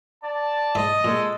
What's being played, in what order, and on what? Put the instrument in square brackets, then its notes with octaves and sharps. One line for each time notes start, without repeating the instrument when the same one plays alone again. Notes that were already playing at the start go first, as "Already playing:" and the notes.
[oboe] D5 [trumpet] A5
[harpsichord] G#2 E5 [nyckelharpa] D#5
[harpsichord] A#2 [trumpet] G#3 [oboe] A4